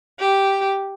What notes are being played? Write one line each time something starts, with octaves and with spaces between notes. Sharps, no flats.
G4